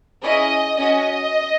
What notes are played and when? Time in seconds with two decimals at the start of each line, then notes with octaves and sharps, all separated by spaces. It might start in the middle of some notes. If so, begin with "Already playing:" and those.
0.24 C#4 E4 G#4 D#5
0.79 C#4 F#4 D#5